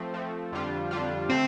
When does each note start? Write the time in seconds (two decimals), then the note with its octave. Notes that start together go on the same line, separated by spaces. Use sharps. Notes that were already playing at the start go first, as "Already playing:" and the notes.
Already playing: F3 A3 C4
0.14 F3 A3 C4
0.52 F2 D3 G3 D4 F4
0.91 F2 D3 G3 D4 F4
1.30 D3 A3 C4